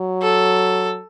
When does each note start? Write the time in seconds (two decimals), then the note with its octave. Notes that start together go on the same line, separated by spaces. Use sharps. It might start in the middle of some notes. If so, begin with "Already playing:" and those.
Already playing: F#3
0.22 A4